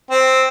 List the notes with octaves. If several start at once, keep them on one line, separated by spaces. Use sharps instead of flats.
C4